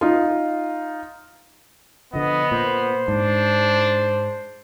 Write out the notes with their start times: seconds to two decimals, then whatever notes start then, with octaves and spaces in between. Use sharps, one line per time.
0.01 D#4 F4
2.13 D3 F3 B3 D#5
2.51 A#2 C5
3.08 G#2 D4